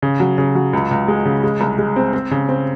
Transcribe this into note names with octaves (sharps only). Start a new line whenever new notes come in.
C#3
F#3
C#3
F#3
C#2
C#2
G#3
C#3
G#3
C2
G#3
C4
C4
C#3
C4